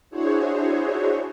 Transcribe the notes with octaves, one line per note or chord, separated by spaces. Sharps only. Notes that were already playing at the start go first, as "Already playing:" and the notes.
D4 E4 F#4 G#4 C5 C#5